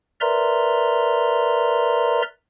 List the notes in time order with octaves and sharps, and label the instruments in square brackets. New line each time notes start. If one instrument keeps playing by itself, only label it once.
[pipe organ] A#4 B4 D5 E5 A#5 C6